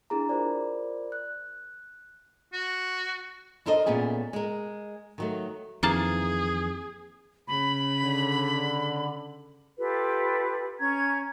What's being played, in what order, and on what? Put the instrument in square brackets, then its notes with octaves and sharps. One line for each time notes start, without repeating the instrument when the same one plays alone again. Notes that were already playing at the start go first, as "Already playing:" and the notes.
[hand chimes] D4 E4 G#4 A#5
F4 A#4 C5 D5
F#6
[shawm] F#4
[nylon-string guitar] D4 A4 A#4 C5 D#5
A#2 A3 B3 C#4 G#4
G#3 A#4
D#3 F#3 A3
[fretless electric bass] F2 D#3 E3 [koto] A#3 F5 A5 [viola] G#4
[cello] C#3 [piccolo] B5
[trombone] D3
[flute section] F4 G4 A4 B4
C#4 A#5 C#6 G#6